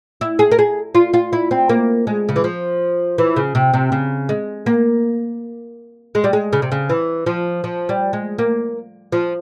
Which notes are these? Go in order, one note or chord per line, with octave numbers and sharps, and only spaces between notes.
E4
G#4
A#4
G#4
F4
F4
E4
C4
A#3
G#3
C#3
E3
F3
E3
C#3
C3
C3
C#3
G#3
A#3
G#3
G3
G#3
C#3
C3
C#3
E3
F3
F3
G3
G#3
A#3
F3